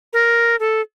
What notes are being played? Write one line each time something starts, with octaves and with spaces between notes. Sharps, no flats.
A#4
A4